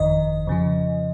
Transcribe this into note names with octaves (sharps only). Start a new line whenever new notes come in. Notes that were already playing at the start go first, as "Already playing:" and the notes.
Already playing: G1 F2 D#3 D#5
F2 C#3 F3